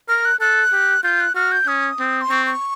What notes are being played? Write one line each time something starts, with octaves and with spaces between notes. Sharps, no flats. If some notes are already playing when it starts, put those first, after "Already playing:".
A#4 F6
F#6
A4 F#6
G4
F4 G6
F#6
F#4 F6
G6
C#4 D#6
C4
C6
C4 C#6
C#6